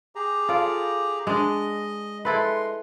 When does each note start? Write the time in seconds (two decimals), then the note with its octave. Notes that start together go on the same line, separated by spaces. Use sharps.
0.15 G4 G#4 A#5
0.49 F4 A4 D5
1.27 G#3 D4 D#5
2.25 G#3 E4 A4 B4 C6